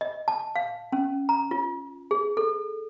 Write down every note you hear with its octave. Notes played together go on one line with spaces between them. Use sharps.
D#5
A5
F5
C#4
A#5
F4
G#4
A4